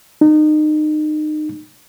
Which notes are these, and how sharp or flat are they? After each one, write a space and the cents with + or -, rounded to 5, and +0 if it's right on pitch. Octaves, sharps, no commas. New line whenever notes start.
D#4 -30